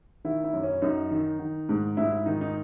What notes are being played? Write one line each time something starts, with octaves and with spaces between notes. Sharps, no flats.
D#3 E4
E4
F#2
C#4
F#2 D#4
D#3
D#3
G#2
G#2 E4
E4
D#3 D#4
D#4